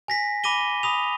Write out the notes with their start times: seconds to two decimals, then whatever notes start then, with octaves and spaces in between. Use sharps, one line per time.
0.08 G#5 A#6 B6
0.44 B5 D6 A#6 D#7 G7
0.83 B5 D#6 F7